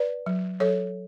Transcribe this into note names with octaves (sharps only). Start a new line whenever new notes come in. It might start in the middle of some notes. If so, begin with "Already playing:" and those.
Already playing: B4 D5
F#3
F#3 A4 C#5